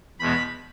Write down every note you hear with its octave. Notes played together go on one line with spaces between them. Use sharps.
E2 B2 G#3 B3 B5